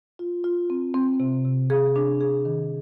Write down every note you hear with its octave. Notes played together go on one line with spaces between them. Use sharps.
F4
F4
C4
C4
C3
C3
G#4
D4
G#4
D#3